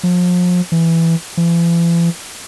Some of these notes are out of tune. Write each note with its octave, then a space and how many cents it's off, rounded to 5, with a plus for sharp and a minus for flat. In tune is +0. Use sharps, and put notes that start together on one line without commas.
F3 +35
E3 +5
E3 +45